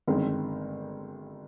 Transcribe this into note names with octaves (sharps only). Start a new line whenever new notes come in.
G1 F#2 D#3 G#3 C4